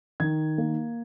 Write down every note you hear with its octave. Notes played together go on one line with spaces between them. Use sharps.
D#3 G#6
A#3